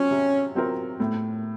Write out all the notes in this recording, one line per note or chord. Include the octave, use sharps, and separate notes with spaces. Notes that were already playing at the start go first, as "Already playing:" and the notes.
Already playing: F#3 C4 C#4 F4
C3
F#3 C4 F4 A#4
A2